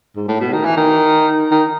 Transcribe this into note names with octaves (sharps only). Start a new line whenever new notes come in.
G#2
A2
B2
D#3
E3
D#3
D#3